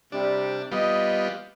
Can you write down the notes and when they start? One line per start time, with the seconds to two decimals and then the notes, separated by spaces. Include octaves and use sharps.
0.12 C3 G3 D4
0.72 G3 B3 F4 D#5